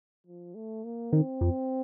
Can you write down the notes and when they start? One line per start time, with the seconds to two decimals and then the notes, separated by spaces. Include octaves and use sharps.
0.26 F3
0.55 A3
0.84 A#3
1.12 D#3 C4
1.41 F2